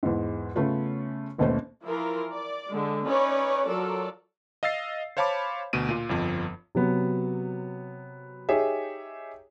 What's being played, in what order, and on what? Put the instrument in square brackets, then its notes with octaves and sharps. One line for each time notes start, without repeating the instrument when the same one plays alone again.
[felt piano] E2 G#2
C#3 A3 B3 C#4 F4
A1 D#2 B2 A3 C#4 C5
[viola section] E3 F3 E4 F4 A#4
D5
D3 G#3
C#4 D#4 B4 C#5 D5
F#3 F4 A4 A#4 D5
[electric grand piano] D#5 F5 E6 A6 C7
C5 C#5 F5 A5 B5 D6
D2 B2 D7 D#7
A#2 F4
G1 F2 F3
[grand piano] C3 F#3 B3
D#4 G4 G#4 C#5 E5